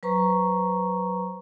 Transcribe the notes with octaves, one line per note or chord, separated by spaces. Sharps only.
F#3 B4 C5 A#5 C#6